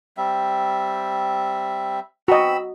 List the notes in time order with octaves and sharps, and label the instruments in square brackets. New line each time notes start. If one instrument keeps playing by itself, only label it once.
[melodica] G3 C4 E5
[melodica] C4 B5 E6 [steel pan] F#4 D#5